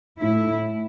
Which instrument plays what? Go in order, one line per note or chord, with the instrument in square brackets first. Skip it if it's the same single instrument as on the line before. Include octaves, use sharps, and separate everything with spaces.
[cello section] A2 A3 E4